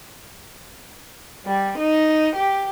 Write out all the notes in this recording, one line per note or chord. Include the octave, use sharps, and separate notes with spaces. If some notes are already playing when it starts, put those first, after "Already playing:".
G3
D#4
G4